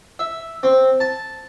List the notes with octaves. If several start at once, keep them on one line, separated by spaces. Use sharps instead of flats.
E5
C4
A5